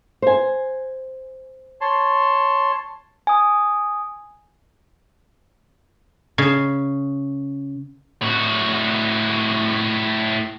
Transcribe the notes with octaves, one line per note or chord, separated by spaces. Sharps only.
C5 G#5
C#5 A5 C6
G#5 D#6
C#3
A2 F#4